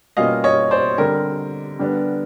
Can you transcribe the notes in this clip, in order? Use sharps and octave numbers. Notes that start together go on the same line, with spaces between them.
B2 G3 A#3 C#4 F4 D#5 F5
C#5 D#5
C5 D5
D3 G3 C4 A#4
D3 G3 B3 D4